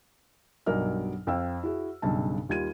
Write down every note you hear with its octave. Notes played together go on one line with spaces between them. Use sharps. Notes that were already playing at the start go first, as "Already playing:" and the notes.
B1 G2 F#3 A#4 D5 F6
F2 F5 G5 E6
E4 F#4 G#4
B1 G2 C#3 A5
D#2 G3 F4 G#6 D#7